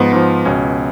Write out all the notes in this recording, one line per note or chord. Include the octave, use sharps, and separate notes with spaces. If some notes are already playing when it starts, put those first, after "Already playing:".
Already playing: G#2 F3 B3
G#2 F3
C#2 B2 C#4